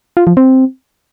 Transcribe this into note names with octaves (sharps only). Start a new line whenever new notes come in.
F4
F3
C4